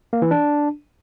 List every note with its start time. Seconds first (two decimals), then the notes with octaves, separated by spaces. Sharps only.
0.13 A#3
0.22 E3
0.31 D4